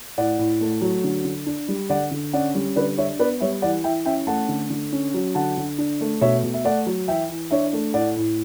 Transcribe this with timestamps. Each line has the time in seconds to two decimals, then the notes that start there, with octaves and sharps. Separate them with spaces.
0.18 A2 D5 F#5
0.39 A2
0.61 A3
0.81 F#3
1.04 D3
1.25 D3
1.46 D4
1.69 G3
1.89 D3 D5 F#5
2.11 D3
2.33 C#4 D5 F#5
2.55 G3
2.76 D3 B4 D5
2.98 D4 C#5 E5
3.19 B3 B4 D5
3.41 G3 C#5 E5
3.62 E3 D5 F#5
3.84 E3 E5 G5
4.06 C#4 E5 G5
4.27 A3 F#5 A5
4.49 D3
4.70 D3
4.92 C#4
5.14 F#3
5.35 D3 F#5 A5
5.58 D3
5.78 D4
6.01 A3
6.21 B2 C#5 E5
6.44 B2
6.54 E5
6.65 A3 D5 F#5
6.87 F#3
7.08 E3 E5 G5
7.29 E3
7.51 D4 C#5 E5
7.73 A3
7.94 A2 D5 F#5
8.17 A2